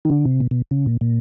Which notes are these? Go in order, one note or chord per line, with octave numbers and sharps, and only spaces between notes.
D#3
D3
C3
B2
B2
C#3
A#2
A#2